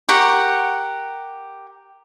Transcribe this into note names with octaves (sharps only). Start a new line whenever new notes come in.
G4 A#4 F#5 C#6